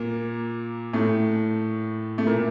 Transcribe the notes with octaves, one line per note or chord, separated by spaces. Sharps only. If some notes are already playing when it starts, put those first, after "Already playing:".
Already playing: A#2 A#3
A2 A3
A3
A#2 A#3